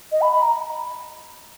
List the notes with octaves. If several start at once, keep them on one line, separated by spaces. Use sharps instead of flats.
D#5
B5
B5
A#5